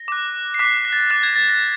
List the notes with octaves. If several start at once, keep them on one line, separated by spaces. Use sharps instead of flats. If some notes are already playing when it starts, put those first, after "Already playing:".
Already playing: A#6
D6 F#6
C7
D6 F#6 B6
A#6
A6
A#6
D6 F#6 A6
G#6
A6
A#6